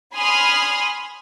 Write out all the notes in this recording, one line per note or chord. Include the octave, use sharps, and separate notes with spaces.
G#5 B5 C6 D#6 F6